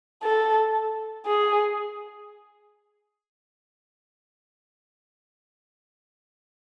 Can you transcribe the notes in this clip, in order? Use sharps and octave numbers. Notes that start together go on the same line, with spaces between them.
A4
G#4